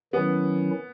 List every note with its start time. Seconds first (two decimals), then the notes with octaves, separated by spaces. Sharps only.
0.13 D#3 F#3 B3 C#4 E4